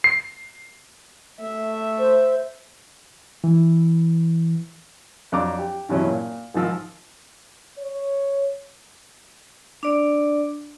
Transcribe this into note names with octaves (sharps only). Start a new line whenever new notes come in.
C7
A3 E5
C5
E3
F2 F#3 D4 A#5 D6
G4
G2 B2 E3 F#3 C#4 E4
A#2
G#1 D#3 F3 E6
C#5
D4 D5